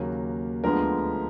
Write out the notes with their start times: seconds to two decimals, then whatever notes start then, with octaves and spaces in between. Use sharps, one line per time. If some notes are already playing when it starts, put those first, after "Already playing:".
Already playing: D#2 C#3 F#3 A#3
0.64 D2 D3 F3 G#3 B3 A#4